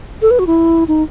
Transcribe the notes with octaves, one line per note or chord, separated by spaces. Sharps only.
A4
B4
F#4
E4
D#4